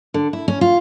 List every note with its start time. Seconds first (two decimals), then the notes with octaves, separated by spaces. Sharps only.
0.14 D3
0.33 E4
0.48 C#4
0.61 F4